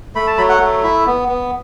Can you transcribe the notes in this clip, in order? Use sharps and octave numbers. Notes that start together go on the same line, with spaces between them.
A3 B5
A5
F#3 B5
F#5
A3
E4 E5
B3
B3